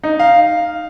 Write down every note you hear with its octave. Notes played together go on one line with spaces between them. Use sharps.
D#4
F5